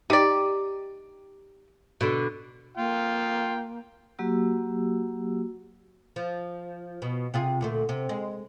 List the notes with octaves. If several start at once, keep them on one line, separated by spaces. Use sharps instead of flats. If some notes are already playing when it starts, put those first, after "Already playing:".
D#4 G4 D5
B2 D3
A#3 F4 G5
F#3 A#3 F#4 G4 E6
F3
B2
C3 F4 G#4
D2 A#2 A3
C3
G#3